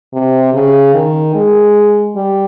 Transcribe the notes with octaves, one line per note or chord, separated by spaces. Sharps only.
C3
C#3
D#3
G#3
G3